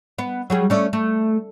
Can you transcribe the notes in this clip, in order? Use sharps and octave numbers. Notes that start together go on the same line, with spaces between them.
B3
F#3 G3 G#4
A3 C#4 D5
A3